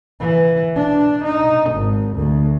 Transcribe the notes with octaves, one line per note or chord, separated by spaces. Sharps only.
E3
D4
D#4
G#1
D2